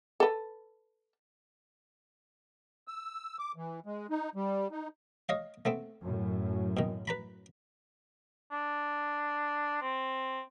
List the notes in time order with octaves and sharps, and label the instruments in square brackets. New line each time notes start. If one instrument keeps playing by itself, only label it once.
[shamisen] A4 B4
[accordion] E6
D6
E3
G#3
D#4
G3
D#4
[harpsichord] C#5 D#5 F5
A3 B3 C4
[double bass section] F#2 A2
[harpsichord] B2 D#3
B4 A#5 B5
[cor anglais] D4
C4